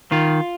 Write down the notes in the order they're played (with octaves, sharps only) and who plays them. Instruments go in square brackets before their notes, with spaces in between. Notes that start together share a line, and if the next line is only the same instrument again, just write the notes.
[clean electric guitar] D#3 F4